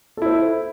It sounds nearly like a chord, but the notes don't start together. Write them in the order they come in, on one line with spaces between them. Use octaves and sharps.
A4 E4 C5